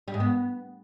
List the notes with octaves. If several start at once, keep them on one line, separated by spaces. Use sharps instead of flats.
G3
G#2
B3